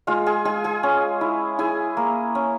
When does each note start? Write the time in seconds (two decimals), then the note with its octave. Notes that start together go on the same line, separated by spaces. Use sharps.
0.07 G#3 F4 F5
0.26 G#4 G#5
0.45 G#3 G#4 G#5
0.64 G#4 G#5
0.83 C#4
1.21 E4
1.59 E4 G#4 G#5
1.97 A#3
2.35 C#4